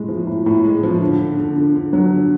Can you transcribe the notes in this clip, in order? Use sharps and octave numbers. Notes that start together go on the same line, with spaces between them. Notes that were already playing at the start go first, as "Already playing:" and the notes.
Already playing: A2 G#3
F3
A2
A2
G#3
F3
D3
D3
D3
D3
D3
F#3
D3